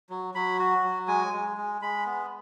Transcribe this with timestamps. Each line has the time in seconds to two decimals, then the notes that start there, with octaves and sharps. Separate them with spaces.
0.10 F#3
0.34 F#3 B5
0.59 F#4
0.84 F#3
1.08 G#3 G#5
1.33 G#3
1.57 G#3
1.82 G#3 B5
2.06 B3